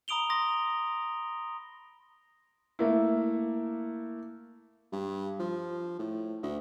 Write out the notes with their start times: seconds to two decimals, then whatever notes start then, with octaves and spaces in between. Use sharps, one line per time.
0.08 A#5 B5 D#6 D7 F7 G7
0.30 C6 D#6 A#6
2.79 A3 A#3 E4
4.92 G2
5.40 F3
5.99 A2
6.43 D2